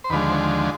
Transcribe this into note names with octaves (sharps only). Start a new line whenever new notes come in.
C5
D#2 D3 F3 G#3 B4
C5